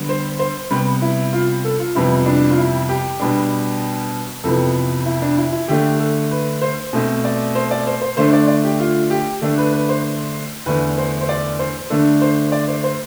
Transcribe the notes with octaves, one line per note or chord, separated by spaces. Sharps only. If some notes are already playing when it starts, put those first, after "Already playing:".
Already playing: D3 G3 B3
C5
C5
C3 G3 B3 B4
E4
F4
A4
F4
F2 C3 E3 G3 B3 E4
D4
F4
E4
G4
B2 G3 B3 D4
F2 C3 E3 B3 A4
E4
D4
E4
E4
D3 A3 D4 G4
A4
B4
C5
B2 A3 C4
D5
C5
D5
C5
C5
D3 A3 D4 C5
D5
D5
G4
F4
G4
D3 A3 D4 A4
B4
B4
C5
E2 D3 A3 D4 B4
C5
C5
D5
C5
D3 A3 D4 A4
C5
D5
C5
C5